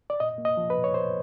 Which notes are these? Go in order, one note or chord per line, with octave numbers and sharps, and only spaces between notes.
D5
A#2 D#5
A#3
D#5
F3
B4
A#2
C#5
A#2 C5